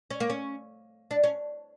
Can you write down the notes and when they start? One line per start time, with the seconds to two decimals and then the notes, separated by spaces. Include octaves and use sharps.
0.10 C#4
0.20 A#3
0.30 C#4
1.11 D4
1.24 C#4